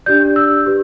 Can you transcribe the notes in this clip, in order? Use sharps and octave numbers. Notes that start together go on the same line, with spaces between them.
D4 G4 D5 G6
E6
G4 B4